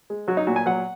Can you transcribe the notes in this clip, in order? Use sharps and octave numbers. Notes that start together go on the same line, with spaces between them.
G#3
F#3 F#4
D#4
A#2 F#4
G#5
F#3 F#5